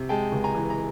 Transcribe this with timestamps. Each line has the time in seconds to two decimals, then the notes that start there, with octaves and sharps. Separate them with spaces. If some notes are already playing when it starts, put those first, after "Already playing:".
Already playing: C3
0.09 G#3 G5 A5
0.32 C#2
0.44 G#5 A#5
0.55 E3
0.70 A#5